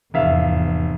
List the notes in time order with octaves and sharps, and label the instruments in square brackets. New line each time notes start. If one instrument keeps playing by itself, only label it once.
[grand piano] F1 E5 F5 [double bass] E2 G#2